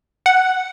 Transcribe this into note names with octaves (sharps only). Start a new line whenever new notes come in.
F#5